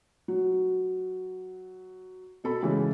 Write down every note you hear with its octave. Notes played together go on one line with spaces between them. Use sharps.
F#3
B2 A4 B5
C#3 E3 G#3